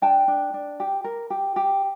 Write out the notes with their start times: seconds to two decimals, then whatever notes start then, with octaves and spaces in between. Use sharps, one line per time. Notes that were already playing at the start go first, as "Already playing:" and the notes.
0.02 D4 G5 A5
0.28 D4
0.54 D4
0.80 G4
1.04 A#4
1.30 G4
1.56 G4